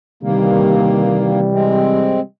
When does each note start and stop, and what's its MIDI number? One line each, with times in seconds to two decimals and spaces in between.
0.23 2.23 48
0.23 1.40 51
0.23 2.23 52
0.23 2.23 55
0.23 1.40 58
1.53 2.20 56
1.53 2.20 60